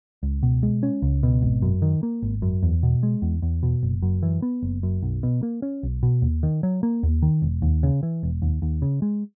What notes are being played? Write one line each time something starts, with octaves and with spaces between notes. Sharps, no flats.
C#2
B2
G#3
C#4
C#2
B2
G#1
F#2
D#3
A#3
G#1
F#2
E2
B2
G#3
E2
E2
B2
F#1
F#2
E3
B3
F#1
F#2
B1
B2
A#3
C#4
B1
B2
D#2
D#3
F#3
A#3
D#2
D#3
E1
D#2
C#3
E3
E1
D#2
D#2
C#3
G#3